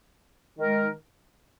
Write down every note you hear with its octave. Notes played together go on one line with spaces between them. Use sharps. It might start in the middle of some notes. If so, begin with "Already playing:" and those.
D#3 G#3 D#4 A#4